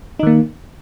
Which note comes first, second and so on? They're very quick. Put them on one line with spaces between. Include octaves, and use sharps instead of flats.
D#4 D#3 A#3